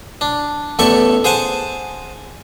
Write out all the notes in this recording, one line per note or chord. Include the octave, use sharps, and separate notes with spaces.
D4
A1 E2 A4 D5 E5 C#6
G#4 C5 F#5 G#5 A5